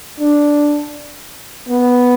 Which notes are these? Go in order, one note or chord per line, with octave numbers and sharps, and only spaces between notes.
D4
B3